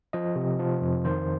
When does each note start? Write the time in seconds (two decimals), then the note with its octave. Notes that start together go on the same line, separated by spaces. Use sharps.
0.13 F3 D#5
0.36 C3
0.59 F3
0.81 F2
1.05 D#3 C5